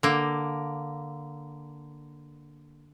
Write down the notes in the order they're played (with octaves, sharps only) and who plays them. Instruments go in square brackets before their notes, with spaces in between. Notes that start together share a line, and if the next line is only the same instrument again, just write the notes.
[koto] D3 A#3